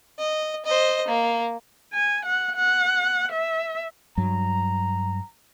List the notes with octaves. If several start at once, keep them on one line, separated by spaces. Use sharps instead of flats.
D#5
C5 D#5
A#3
G#5
F#5
F#5
E5
G2 F#3 A#5